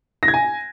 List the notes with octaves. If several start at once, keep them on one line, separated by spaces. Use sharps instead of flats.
A#6
G#6
G#5